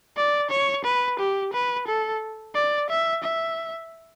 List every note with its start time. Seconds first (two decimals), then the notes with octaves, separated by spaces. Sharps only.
0.17 D5
0.51 C#5
0.85 B4
1.19 G4
1.54 B4
1.88 A4
2.55 D5
2.90 E5
3.24 E5